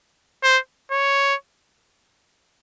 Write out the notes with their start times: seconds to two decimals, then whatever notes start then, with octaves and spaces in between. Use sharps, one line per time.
0.44 C5
0.92 C#5